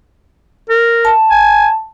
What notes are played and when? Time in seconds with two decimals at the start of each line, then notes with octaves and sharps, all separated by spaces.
0.70 A#4
1.05 A5
1.31 G#5